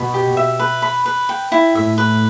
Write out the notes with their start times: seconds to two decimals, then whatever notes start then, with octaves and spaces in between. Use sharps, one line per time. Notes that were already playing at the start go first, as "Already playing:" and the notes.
Already playing: B2 B5
0.14 G4
0.37 E5
0.59 B4
0.82 B5
1.06 B4
1.29 G5
1.52 E4
1.74 A2 E5
1.98 B4